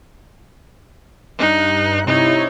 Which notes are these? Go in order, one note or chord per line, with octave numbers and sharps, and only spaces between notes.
G2 D#4 F#6
C3 D#4 E4 C#5